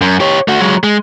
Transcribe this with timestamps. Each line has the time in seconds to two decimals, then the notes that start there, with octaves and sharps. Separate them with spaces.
0.01 F#2
0.20 G4 C#5
0.48 A3 F#4
0.60 F#3 G#3
0.83 G#3